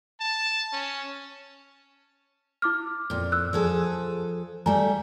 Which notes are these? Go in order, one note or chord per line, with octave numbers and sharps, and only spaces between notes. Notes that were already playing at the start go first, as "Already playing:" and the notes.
A5
C#4
E4 D6 F6
F2 A#2
E6 F#6
F3 G#4 A4
G3 A3 G#5 A#5